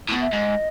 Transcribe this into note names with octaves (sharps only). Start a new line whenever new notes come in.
A2
B2
E5
G#2 D#5